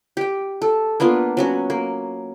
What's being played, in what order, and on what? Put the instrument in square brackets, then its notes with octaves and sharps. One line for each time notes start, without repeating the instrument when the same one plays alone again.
[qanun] G4 G5
A4
A#3 B3 D4 F4
F#3 C#4 F#4
A#3